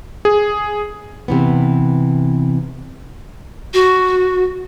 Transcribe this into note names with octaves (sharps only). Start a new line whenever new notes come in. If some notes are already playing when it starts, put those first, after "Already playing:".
G#4
C3 E3 B3
F#4